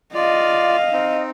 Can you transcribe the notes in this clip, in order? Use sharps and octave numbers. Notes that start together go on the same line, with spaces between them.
F4 D5 D#5 F5
C4 D#4